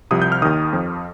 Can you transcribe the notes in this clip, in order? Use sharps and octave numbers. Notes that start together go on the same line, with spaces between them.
C2 C3 F3 D#6
G6
F6
D#2 D#3 D#6
F2 F3